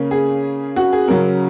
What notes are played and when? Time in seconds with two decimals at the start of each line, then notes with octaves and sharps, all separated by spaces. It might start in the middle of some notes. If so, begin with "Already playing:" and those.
Already playing: C#3 A#3 C#4
0.11 G#4
0.76 F#4
0.93 G#4
1.08 C#3 F#3 C#4 A#4